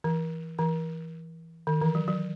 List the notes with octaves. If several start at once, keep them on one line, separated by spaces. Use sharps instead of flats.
E3
E3
D#3
E3
F#3
F#3